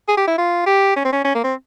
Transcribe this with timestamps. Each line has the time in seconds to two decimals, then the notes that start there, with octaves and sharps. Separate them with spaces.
0.08 G#4
0.17 G4
0.27 E4
0.38 F4
0.66 G4
0.96 C#4
1.04 C4
1.13 C#4
1.25 C#4
1.35 A#3
1.44 C4